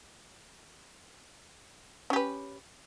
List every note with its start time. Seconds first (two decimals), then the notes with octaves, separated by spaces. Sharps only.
2.10 C#4
2.13 G4
2.16 B4